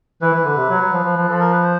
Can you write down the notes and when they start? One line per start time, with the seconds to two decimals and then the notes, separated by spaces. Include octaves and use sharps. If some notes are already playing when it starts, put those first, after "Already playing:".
0.21 E3 B4
0.33 E3
0.45 D3
0.56 C3
0.69 F#3
0.81 F#3
0.93 F3
1.04 F3
1.17 F3
1.28 F3 A4
1.40 A#4
1.52 B4
1.63 C5